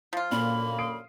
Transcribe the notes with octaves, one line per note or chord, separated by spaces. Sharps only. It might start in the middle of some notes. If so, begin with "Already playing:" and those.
F3 F4
F#2 A#2 D3 A#3 B5
D#6 C7 D7